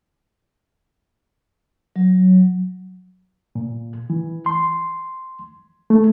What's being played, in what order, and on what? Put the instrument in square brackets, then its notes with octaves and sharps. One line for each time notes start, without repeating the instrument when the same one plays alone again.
[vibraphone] F#3
[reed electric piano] A#2
E3
C6
A3